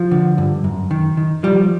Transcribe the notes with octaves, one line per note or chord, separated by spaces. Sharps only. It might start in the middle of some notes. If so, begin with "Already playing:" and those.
Already playing: F3
D3
G2
F#2
D#3
D#3
F3 G3